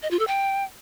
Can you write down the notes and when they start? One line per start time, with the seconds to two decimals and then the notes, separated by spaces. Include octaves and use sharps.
0.03 D#5
0.11 F4
0.19 A4
0.27 G5